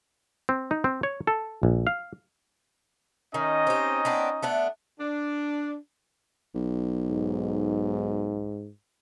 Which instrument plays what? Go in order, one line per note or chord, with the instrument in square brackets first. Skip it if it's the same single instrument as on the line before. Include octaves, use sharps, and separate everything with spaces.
[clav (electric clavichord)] C4
D#4
C4
C#5
A4
A#1
F5
[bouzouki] D#3 [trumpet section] C#4 D#4 D#5
[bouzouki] C4 G4
B3 C4 D4
A3 B3 D4
[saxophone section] D4
[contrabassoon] B1
[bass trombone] G#2